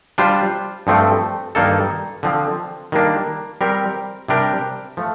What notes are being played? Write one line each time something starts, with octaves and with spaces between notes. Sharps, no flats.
G3 D4 F4 C5
G2 F3 A3 C4
G2 D#3 A#3 D#4 A4
D3 F3 C4
D#3 G3 A#3 D4
G3 C4 G4 A#4
C3 G3 D4 G4 A#4
F3 A3